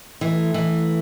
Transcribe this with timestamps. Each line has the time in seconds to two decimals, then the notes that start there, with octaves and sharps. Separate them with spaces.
0.21 E3 A3
0.54 E3